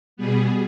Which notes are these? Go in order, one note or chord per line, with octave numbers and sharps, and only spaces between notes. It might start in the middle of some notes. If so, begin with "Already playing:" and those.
B2 G3 B3 G#4